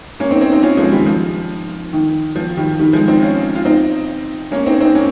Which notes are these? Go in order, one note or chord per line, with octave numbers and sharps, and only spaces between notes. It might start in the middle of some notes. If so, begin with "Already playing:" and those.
A#3 C#4
C4 D#4
C4 D#4
C4 D#4
C#4 F4
F3 G#3
D#3 G3
F3
D#3
F3
D#3 G3
D#3 G3
F3 G#3
C4 D#4
C#4 F4
F4
C4 D#4
A#3 C#4
C4 D#4
C4 D#4
A#3 C#4